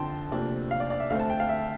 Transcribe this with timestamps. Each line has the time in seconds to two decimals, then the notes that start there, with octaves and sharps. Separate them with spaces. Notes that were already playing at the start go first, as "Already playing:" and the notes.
Already playing: F2 D3 F3 G5 A5 C6
0.31 D2 C3 F3 A#3 D4
0.71 F5
0.80 D5
0.90 D5
1.00 E5
1.10 D2 D3 A3 C4 F5
1.19 A5
1.30 G5
1.40 F5
1.49 E5